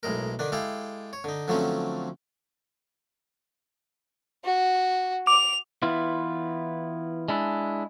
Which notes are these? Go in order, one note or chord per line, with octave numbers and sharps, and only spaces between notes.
B1 A2 G#3 A#4
D3 D#3 D4
G#3 E4 G4 A4 F5
C#5
D3 D#4
D3 F3 F#3 A3 C4 C#4
F#4
D6 F7
E3 B3 E4 F4
G#3 D4 E4